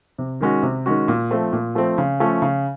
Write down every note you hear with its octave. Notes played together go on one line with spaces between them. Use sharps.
C3
D#3 G#3 C#4 F#4
C3
D#3 G#3 C#4 F#4
A#2
F3 A3 C4
A#2
F3 A3 C4
C#3
F3 A3 C#4
C#3